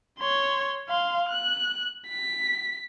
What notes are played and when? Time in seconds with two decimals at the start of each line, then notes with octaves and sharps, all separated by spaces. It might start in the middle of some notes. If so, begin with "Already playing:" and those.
0.19 C#5 C6
0.89 F5 C6
1.29 F#6
2.09 B6